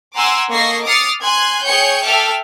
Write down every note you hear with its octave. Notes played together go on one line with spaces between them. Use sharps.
F#5 G#5 A#5 C6 D6 E6
A#3 A4 D#5 C#6 A#6 C7
D6 D#6 F6 A6 C7 C#7
G#5 C6 F#6 G#6
G#4 C#5 G5 G6 G#6 C#7
A4 E5 G5 D6 F6